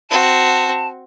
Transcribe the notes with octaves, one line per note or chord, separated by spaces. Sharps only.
C4 F#4 A5